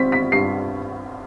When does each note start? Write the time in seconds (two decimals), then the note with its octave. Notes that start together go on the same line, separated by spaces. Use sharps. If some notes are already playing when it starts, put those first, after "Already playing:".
Already playing: C4 B6
0.12 B6
0.32 G2 C7